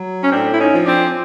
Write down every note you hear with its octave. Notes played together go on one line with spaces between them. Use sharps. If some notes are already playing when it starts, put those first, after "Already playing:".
Already playing: F#3
C#4
A2 C4 D4
E4
C#4 D#4
F3
C4 D4